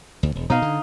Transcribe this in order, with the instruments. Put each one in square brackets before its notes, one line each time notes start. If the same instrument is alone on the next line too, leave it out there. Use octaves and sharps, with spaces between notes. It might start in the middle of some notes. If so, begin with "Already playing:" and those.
[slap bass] D2
E1
[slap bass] B2 B3 [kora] D#4 D#5 F5
[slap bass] D3